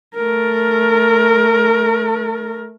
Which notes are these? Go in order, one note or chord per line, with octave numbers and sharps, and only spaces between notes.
A3 A#4